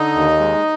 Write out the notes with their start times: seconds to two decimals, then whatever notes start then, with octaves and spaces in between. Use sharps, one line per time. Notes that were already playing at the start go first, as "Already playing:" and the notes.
Already playing: D3 D#4 D#5
0.15 D#2
0.40 G#3